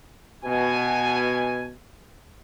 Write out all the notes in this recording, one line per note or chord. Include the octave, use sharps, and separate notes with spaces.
B2 G#5